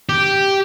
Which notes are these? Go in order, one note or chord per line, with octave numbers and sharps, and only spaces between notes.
G4